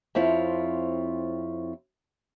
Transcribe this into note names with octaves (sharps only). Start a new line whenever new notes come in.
F2 C4 E4 F4 C#5